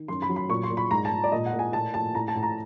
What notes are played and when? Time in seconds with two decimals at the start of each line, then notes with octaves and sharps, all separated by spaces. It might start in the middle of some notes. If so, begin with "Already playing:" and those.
Already playing: D#3
0.08 F#2 C6
0.22 B5
0.29 F#3
0.36 B5
0.49 A#2 C#6
0.63 C6
0.70 A#2
0.77 B5
0.91 G#2 A#5
1.05 A5
1.11 G#2
1.24 D5
1.32 A#2 D#5
1.46 F#5
1.53 A#2
1.59 G#5
1.73 A2 A5
1.94 A2 A5
2.15 A2 A#5
2.28 A5
2.35 A2
2.43 A#5